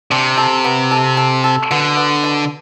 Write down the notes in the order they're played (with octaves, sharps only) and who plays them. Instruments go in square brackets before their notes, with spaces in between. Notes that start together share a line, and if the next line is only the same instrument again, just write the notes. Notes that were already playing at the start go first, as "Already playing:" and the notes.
[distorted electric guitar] C3 [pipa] D4
[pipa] A4
B3
A4
A4
A4
[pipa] B2 [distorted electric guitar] D3
[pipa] B3
B2